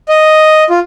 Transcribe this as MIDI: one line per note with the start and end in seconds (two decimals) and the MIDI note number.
0.09 0.64 75
0.70 0.79 65